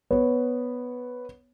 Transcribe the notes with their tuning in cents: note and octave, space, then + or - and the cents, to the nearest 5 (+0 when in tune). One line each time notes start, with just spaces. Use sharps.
B3 +0 C#5 +0